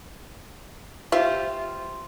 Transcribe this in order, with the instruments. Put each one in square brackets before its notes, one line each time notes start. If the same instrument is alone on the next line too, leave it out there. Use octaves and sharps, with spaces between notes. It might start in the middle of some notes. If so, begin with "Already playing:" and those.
[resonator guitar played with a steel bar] F4 G4 C5 [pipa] E5 C6